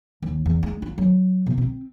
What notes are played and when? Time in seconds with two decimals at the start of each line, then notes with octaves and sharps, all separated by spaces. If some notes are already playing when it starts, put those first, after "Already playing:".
0.22 D#2
0.46 E2
0.63 G#3
0.82 F4
0.98 F#3
1.46 B2
1.58 C4